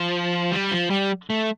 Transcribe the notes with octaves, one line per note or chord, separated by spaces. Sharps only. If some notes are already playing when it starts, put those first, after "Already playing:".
Already playing: F3
G3
F3
G3
A3